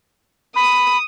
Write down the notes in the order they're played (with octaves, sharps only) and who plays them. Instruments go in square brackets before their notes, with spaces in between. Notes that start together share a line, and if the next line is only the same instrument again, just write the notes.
[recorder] B5 [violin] D#6